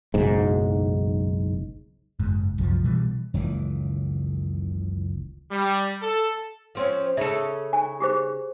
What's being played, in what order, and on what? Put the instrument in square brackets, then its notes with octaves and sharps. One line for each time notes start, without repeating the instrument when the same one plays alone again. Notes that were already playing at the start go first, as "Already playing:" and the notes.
[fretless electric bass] F#1 B1 G#2
F#1 G#2
C2 F#2 F3
B2 E3 G3
[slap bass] F#1 C#2 D#3 E3
[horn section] G3
A4
[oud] F3 C4 C#4
[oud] C#3 A4 [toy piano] E5
[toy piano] G#5
G4 G#4 C5